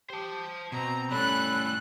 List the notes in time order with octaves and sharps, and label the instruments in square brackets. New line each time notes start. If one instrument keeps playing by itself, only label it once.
[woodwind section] G4 [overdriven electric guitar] C5 A5
[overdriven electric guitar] B2 [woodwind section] C4 [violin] A#5
[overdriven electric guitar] A2 G3 [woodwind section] C#4 A4 [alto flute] B5 [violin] F#6